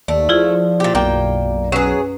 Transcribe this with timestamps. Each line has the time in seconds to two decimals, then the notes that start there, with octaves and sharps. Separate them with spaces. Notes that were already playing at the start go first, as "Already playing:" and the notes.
0.08 D#2 A3 D5
0.29 F3 E4 F4 G#4
0.80 A#2 G4
0.95 B1 F#2 A#3 G5
1.72 F#3 C#4 G#4 B4 F#6